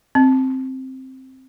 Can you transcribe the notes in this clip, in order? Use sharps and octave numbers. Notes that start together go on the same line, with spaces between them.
C4